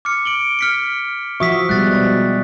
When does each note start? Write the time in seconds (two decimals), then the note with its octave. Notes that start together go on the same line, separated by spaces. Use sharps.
0.05 D6 F6 C#7
0.25 D7 F#7 G7
0.59 F6 B6 C#7
1.40 F3 F#4 E5 C#6 D#6 B6
1.69 B2 G3 G#3 F#6 A6